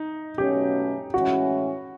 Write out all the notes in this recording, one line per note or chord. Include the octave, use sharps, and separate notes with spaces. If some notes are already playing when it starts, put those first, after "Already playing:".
Already playing: D#4
B2 F#3 A3 C#4 G4
A2 E3 G#3 C#4 F#4